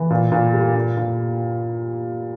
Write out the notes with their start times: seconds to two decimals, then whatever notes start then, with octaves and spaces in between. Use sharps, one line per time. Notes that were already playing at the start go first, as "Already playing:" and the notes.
Already playing: E3
0.10 A#2
0.32 A#2
0.53 G3
0.75 A#2
0.97 A#2